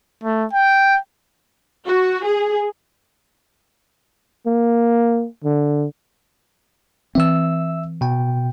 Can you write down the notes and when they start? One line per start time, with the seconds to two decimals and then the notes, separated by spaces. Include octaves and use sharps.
0.24 A3
0.54 G5
1.88 F#4
2.27 G#4
4.47 A#3
5.44 D3
7.15 E3 C4 E5 E6
8.01 B2 G5